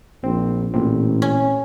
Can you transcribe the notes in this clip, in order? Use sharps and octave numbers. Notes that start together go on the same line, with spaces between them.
A#1 C4
A1 A#2 C4
C#4